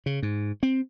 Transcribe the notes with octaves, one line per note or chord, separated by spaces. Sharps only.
C#3
G#2
C4